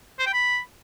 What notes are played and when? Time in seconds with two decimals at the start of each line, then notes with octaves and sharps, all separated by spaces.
0.19 C5
0.26 G5
0.33 B5